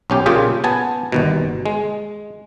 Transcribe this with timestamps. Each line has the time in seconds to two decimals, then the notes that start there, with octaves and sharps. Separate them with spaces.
0.10 B1 C#4 G4
0.26 A#2 C#3 F4 G4 G#4 G5
0.64 B3 G#5 A5
1.12 G1 D#2 B2
1.66 G#3